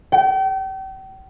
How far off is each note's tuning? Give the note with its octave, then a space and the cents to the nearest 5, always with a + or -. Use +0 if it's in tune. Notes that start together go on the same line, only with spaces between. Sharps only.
G5 -35